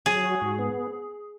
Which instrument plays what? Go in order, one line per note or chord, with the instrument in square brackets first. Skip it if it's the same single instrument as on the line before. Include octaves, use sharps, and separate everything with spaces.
[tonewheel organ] F#3 [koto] G#4
[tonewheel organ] F#4
G#2
B3